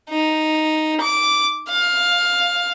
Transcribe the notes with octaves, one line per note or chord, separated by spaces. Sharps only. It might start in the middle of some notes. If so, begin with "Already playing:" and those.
D#4
D6
F5